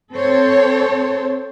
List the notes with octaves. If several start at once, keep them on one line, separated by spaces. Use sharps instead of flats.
C4 A4 C5 C#5